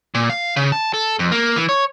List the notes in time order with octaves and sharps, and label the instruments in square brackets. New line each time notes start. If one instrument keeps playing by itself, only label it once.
[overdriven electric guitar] A#2
F5
C#3
A5
A4
F2
A#3
E3
C#5